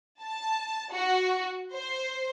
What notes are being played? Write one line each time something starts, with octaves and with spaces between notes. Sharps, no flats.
A5
F#4
C5